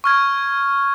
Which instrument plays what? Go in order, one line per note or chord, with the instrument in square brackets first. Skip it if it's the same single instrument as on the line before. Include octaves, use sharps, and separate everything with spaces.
[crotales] C#6 F6 G#6